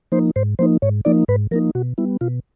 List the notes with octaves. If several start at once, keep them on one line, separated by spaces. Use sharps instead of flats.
F3 A#3 D#4 C5
G#2 C5
F3 A#3 D#4 C5
G#2 C#5
F3 A#3 D#4 D5
G#2 B4
F3 A#3 D#4 A#4
B2 F#4
G3 B3 E4
B2 F4